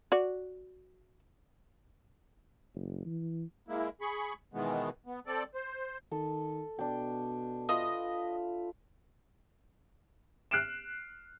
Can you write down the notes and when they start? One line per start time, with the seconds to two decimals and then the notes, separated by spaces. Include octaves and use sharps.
0.12 F#4 D5
2.75 F#1
3.05 E3
3.68 G#3 A#3 E4
4.01 G#4 B5 C#6
4.54 B2 D#3 E3 G#3 B3
5.06 B3
5.27 C4 A4 D5
5.54 C5
6.12 D#3 A4
6.79 B2 D4 G5
7.69 F4 B4 D#5 E5
10.51 F6 F#6 C7 D7 E7